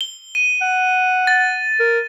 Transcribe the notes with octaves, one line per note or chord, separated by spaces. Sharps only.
G7
D#7
F#5
A6
A#4